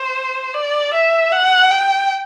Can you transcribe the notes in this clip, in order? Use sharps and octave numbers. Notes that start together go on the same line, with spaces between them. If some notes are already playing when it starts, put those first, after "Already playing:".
Already playing: C5
D5
E5
F#5
G5